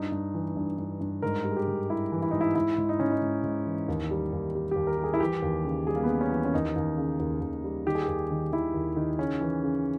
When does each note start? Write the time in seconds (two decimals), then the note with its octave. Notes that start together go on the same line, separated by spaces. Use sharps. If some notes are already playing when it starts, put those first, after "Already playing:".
Already playing: G2 D#4
0.12 G2
0.34 E3
0.57 G2
0.78 G2
1.01 G2
1.22 G#2 A#4
1.44 G3
1.51 G#4
1.57 G4
1.68 G#2
1.90 G3 E4
2.12 E3
2.22 E4
2.31 G#2 D#4
2.41 E4
2.55 G#2 E4
2.78 G#2
2.89 D#4
3.00 G#2 C#4
3.12 D#4
3.22 G#2
3.43 G#2
3.66 E3
3.88 D#2
4.11 G3
4.33 D#2
4.55 G3
4.71 D#2 G4
4.87 A#4
4.98 G3
5.04 G#4
5.14 E4
5.20 E3 G4
5.42 D#2
5.64 C#3
5.87 G3 G#4
5.95 A#3
6.03 B3
6.09 C#3
6.21 C#4
6.31 E3
6.45 C#4
6.54 D#2 D#4
6.76 D#2
6.98 C#3
7.20 D#2
7.41 D#2
7.64 G3
7.86 D#3 G4
7.95 G#4
8.02 G4
8.08 D#2
8.31 D#3
8.52 D#3 E4
8.74 D#2
8.96 D#3
9.18 C#3 C#4
9.41 E3
9.64 C#3